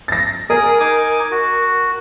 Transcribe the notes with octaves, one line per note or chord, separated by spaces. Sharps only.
A6 A#6
G#4 A#4 D#6
D#4 G#5 D6
F#4